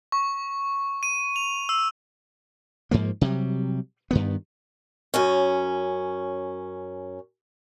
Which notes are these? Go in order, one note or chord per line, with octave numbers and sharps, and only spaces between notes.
C#6
D#7
F7
E6
G#2 F3 A#3
C3 F#3 G3
G2 D#3 B3
F#2 C#4